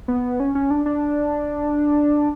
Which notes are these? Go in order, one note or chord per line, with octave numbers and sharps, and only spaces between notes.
B3
C#4
C#4
D4
D4